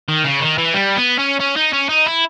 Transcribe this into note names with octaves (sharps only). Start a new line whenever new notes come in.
D#3
C#3
D#3
E3
G3
B3
C#4
C#4
D#4
C#4
D#4
E4